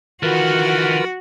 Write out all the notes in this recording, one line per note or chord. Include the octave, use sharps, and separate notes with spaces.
D#3 E3 F4 F#4 A#4 B4 F#5